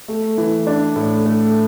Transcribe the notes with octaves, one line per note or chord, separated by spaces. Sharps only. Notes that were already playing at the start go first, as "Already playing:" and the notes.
A3
E3
D4
A2
A3